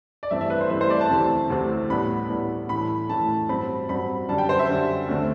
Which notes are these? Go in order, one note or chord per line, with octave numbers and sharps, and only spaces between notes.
D5
G2 E3 A3 C4 E5
E5
B4
C5
G2 E3 A3 C4 E5
C5
D5
A5
D2 C3 E3 A3 C4
D2 C3 E3 A3 C4
A2 G3 B3 B5
A2 G3 B3
A2 E3 A3 B5
A2 E3 A3 A5
G2 F#3 C4 B5
G2 F#3 C4 B5
F#2 D3 G3 A5
G5
C5
E5
F#2 D3 G3
D2 D3 A3 C4